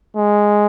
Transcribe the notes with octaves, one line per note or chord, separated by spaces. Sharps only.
G#3